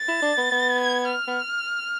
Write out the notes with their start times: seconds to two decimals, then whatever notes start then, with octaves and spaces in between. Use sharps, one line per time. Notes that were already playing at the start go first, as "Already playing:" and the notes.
Already playing: A6
0.08 E4
0.22 D4
0.37 B3
0.52 B3
0.81 G#6
1.10 F6
1.28 B3